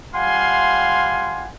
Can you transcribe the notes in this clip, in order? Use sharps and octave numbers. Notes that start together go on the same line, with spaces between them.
G3 F4 F5 F#5 G#5 C6